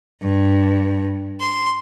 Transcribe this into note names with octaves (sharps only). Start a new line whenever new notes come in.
G2
C6